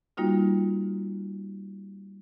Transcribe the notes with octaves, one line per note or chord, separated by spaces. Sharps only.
G3 A#3 D#4 F4 F#4